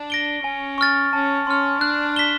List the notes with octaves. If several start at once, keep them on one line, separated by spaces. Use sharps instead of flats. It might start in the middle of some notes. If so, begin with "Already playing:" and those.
Already playing: D4
A#6 D7 G7
C#4 G#5
C#6 F6 A6
C#4 A5
C#4 C6 F6
D4 F#6
B6 E7 G7